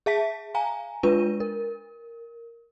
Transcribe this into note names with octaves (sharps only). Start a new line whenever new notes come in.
G#4 E5 A5 B6
F5 G#5 A#5
G#3 D4 F4 B4 D#7
A#4